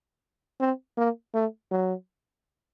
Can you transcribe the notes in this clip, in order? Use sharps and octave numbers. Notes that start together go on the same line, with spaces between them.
C4
A#3
A3
F#3